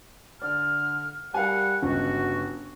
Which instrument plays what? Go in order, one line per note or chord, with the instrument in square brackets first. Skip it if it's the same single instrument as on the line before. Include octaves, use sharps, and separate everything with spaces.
[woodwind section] D3 F6 [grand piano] D5
[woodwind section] G3 F#5 [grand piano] A#4 F5 G#5
[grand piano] G1 C#2 [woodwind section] F#4